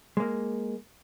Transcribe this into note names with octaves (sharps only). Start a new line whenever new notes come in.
G#3 A#3